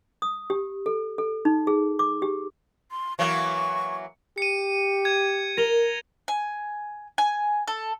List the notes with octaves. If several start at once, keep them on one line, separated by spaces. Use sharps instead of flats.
D#6
G4
A4
A4
D#4
G#4
D6
G4
C6
E3 F#3 A#3 C#6
G4 C#7 D#7
G#6
A#4 A#6 F7 G7
G#5
G#5
A4